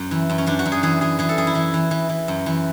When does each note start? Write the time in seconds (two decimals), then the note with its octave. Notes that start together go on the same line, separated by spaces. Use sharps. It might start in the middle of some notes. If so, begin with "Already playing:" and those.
Already playing: F#2
0.11 E3
0.29 F#2
0.38 C#4
0.47 F#2 D4
0.59 F#4
0.65 F#2
0.72 G#4
0.83 E3 G#4
1.01 E3 G#4
1.19 E3 G#4
1.29 A4
1.37 F#2 G#4
1.47 E4
1.55 E3
1.74 E3
1.91 E3
2.09 E3
2.28 F#2
2.46 E3